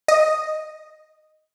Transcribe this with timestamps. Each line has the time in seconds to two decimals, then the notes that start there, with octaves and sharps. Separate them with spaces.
0.08 D#5